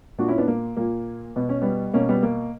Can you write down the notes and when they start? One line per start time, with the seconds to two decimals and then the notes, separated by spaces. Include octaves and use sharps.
0.18 A#2 D4 F#4
0.28 C#4 E4
0.38 B3 D4
0.47 A#3
0.77 A#2 A#3
1.36 B2 B3
1.49 C#4
1.62 G3 B3
1.94 B2 A#3 C#4
2.08 G3 B3
2.23 A#3